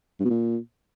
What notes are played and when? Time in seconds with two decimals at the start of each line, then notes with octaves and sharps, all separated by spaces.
0.20 G2
0.25 B2
0.30 A#2